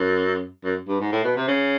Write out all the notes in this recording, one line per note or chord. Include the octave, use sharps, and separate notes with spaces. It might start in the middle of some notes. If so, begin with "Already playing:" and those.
Already playing: F#2
F#2
G2
G#2
A2
B2
C3
C#3